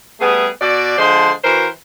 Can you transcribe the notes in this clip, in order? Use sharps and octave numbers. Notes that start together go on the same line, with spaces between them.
G3 A3 B3 G#4
B2 F#4 D5
D3 F3 G#3 C5 C6
E3 F#4 A#4 C5